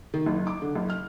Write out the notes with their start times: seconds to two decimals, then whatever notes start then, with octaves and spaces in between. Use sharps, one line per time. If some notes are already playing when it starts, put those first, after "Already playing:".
0.14 D#3
0.26 F#1
0.47 D6
0.62 D3
0.76 F#1
0.90 F6